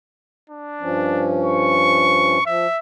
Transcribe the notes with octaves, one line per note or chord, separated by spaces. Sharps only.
D4
G2 F3 C#4
C#6
F3 E5